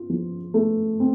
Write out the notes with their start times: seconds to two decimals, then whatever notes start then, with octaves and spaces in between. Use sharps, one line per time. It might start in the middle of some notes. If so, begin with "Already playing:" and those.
Already playing: F4
0.10 F3
0.54 A3
1.00 C4